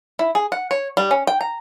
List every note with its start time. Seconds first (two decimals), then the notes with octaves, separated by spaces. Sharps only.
0.19 E4
0.35 G#4
0.52 F#5
0.71 C#5
0.97 G3
1.11 C#4
1.27 G5
1.41 A#5